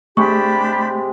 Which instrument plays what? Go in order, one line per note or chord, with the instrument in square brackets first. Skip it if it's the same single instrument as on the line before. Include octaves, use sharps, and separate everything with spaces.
[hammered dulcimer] C3 G#3 [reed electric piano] A3 [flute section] D4 G4 B5 [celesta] C#6